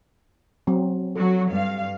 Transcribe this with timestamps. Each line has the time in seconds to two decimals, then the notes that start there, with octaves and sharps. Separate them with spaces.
0.67 F#3 C4
1.16 F#3 F#4 A4
1.50 G2 F5